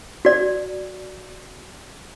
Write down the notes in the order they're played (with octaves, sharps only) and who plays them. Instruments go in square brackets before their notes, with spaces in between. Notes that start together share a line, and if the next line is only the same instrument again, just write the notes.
[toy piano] F#4 D5